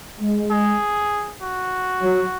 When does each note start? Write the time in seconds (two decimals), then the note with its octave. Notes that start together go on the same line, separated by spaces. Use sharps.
0.20 G#3
0.51 G#4
1.42 F#4
2.03 F#3